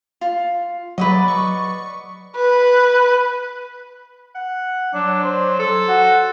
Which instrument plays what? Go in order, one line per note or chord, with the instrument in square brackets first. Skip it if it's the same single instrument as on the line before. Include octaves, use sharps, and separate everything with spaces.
[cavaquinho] F4
[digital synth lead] F#3 [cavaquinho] B4 D5 D#5
[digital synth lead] C#6
[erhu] B4
[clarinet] F#5
[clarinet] F#3 [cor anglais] D4
[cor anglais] C5
[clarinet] A4
[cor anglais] F#4